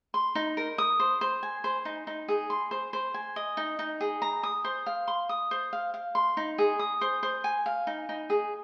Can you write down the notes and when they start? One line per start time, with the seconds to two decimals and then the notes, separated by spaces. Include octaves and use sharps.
0.14 C6
0.35 D#4
0.57 A#4
0.78 D#6
1.00 C5
1.21 C5
1.43 G#5
1.64 C5
1.85 D#4
2.07 D#4
2.28 G#4
2.50 C6
2.71 C5
2.93 C5
3.14 G#5
3.36 D#5
3.57 D#4
3.79 D#4
4.01 G#4
4.22 A#5
4.43 D#6
4.64 C5
4.86 F5
5.08 C6
5.29 D#6
5.51 C5
5.73 F5
5.94 F5
6.15 C6
6.37 D#4
6.58 G#4
6.79 D#6
7.01 C5
7.23 C5
7.44 G#5
7.66 F5
7.87 D#4
8.09 D#4
8.30 G#4